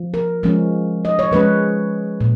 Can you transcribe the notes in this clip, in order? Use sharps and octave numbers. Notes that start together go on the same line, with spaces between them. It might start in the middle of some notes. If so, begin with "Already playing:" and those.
Already playing: F3
A#4
F3 G#3 C#4
D#5
C#5
F3 G#3 C#4 B4
A#2